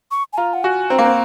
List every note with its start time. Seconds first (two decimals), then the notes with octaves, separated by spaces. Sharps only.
0.11 C#6
0.33 G#5
0.38 F4 A#5
0.54 F#5
0.63 F#4 G#5
0.90 C4 A#5
0.98 A#3
1.05 C4